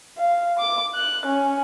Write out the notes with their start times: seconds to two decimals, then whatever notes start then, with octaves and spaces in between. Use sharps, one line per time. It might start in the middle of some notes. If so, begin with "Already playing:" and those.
0.18 F5
0.59 D6
0.95 F#6
1.26 C#4